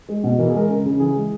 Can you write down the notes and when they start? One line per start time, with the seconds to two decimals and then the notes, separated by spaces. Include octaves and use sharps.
0.09 G#3
0.24 B2
0.38 E3 A#4
0.48 G#4
0.54 G#3 A#4
0.69 C#3 A#4
0.85 C#3
1.00 E3 G#4
1.15 G#3